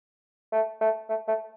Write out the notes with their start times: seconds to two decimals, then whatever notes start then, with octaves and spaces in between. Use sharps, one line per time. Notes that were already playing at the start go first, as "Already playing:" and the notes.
0.52 A3
0.81 A3
1.09 A3
1.28 A3